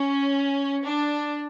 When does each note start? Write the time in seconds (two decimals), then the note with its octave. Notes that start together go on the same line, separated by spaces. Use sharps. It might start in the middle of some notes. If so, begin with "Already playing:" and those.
Already playing: C#4
0.84 D4